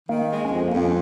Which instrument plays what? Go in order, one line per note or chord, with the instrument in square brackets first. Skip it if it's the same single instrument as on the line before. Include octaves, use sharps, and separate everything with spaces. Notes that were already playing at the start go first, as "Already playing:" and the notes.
[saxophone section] D#3 [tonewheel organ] A#3
[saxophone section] G#3
[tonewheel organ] C#4
[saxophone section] F2 [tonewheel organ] C4
[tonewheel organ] A#3
[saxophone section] F2 [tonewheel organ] C4
[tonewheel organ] C#4